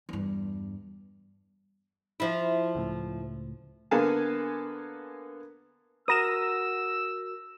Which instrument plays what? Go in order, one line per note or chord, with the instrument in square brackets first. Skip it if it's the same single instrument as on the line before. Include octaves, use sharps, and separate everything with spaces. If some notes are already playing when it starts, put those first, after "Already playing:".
[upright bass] E2 G2
[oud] F3 E4
[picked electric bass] C#2 A2
[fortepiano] D3 A#3 B3 F5 G#5 A5
[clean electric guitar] F#4 A#4 [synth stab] D#6 A#6 E7 [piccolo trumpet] E6